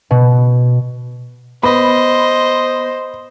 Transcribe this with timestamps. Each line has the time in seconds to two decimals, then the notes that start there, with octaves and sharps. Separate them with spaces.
0.11 B2
1.63 B3 C5 D#5 B5